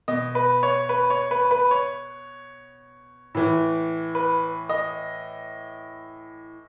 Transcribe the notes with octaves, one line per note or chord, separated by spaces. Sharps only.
B2 D#5
B4
C#5
B4
C#5
B4
B4
C#5
A2 E3
B4
D#5